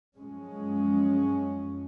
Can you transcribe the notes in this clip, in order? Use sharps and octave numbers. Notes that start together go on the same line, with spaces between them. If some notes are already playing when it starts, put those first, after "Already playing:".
F#2 F3 G#3 C#4